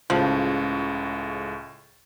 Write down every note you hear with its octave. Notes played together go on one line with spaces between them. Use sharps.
C#2 A2 C#3 F3